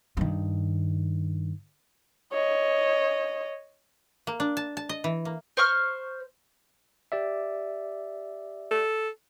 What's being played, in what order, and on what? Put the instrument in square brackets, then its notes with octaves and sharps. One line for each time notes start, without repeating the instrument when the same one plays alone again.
[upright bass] G2 D#3
[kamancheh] C#5 D#5
[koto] A#3
D4
A5
A5
D#5
E3
A#3
[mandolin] C5 C#6 F6
[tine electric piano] G4 D5 E5
[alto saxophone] A4